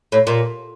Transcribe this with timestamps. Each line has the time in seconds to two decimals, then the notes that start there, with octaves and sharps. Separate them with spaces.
0.12 A2
0.27 A#2